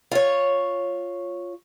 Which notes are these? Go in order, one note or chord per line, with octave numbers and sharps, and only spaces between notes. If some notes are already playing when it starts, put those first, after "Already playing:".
F4 C#5